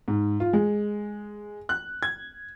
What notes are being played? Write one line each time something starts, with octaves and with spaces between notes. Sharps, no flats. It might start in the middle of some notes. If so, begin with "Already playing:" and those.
G#2
F4
G#3
F#6
G#6